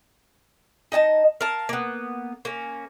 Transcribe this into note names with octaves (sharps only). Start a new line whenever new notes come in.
D#4 D#5 G#5 A5
A#4 F5 A5
A#3 B3
A#3 C#4